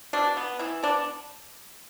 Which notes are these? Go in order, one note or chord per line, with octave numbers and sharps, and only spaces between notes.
B2 D4
B3
E3 E4
B3 D4